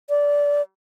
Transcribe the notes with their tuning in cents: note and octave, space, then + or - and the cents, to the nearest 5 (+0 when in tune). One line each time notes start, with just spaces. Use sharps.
D5 -20